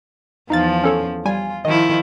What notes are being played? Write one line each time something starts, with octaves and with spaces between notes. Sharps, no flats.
E2 F3 D#4 F5 A6
C#4 A4 C#5
G3 F4 G#5
D#3 F3 E4 D#5